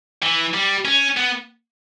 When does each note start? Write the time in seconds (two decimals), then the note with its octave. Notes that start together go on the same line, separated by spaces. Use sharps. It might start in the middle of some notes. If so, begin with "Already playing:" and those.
0.23 E3
0.54 G3
0.85 C#4
1.17 B3